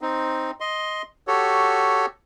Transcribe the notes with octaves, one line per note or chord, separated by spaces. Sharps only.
C4 D#4
D#5 C6
F#4 G4 A4 C#5